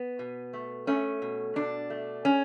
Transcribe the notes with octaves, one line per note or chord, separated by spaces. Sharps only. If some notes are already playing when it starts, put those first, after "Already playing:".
Already playing: B3
B2
A3
A3 C#4
B2
B2 D4
A3
C#4